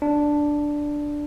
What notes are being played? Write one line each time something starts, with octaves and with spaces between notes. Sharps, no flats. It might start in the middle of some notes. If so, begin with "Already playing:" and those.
D4